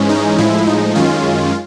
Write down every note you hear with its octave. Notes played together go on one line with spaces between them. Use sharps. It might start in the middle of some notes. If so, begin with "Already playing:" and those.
Already playing: G#2 E3 G#3 C#4
D#4
A2 F3 G#3 E4
D#4
F#2 D#3 G#3 C#4 F4